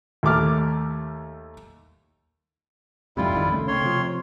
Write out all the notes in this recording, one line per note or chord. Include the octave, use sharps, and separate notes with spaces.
D#2 A3 D6 F6
F2 G#2 C3 G3 E4 F4
G#1 F2 D#3
C2 C#3 A3
F2 C#5 C6
C3 F3